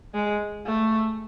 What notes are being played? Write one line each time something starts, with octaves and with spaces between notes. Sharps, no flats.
G#3
A3